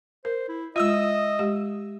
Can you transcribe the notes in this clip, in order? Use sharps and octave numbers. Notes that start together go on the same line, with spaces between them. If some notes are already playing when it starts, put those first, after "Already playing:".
A#4 C5
E4
G#3 F4 D#5 E5 D#6 E6
G#3 G4